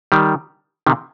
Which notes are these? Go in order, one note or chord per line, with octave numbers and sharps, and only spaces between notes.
D#3 G3
C3 D#3